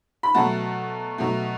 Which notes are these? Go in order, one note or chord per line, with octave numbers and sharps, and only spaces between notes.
B5
B2 F#3 A3 F#5 A5
B2 F#3 A3